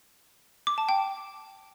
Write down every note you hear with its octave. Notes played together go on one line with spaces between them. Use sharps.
D6
A5
G5